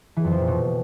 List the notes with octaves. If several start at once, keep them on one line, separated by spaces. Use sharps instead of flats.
E3
F2
F3
A#2
B2